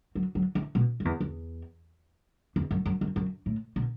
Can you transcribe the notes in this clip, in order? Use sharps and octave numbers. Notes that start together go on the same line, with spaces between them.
F#3
F#3
E3
B2
F#2
E2
E2
E2
F#2
F#2
F#2
F#2
A2
B2